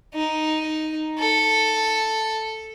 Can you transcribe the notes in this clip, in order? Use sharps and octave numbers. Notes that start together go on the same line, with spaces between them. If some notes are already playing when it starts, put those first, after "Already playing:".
D#4
A4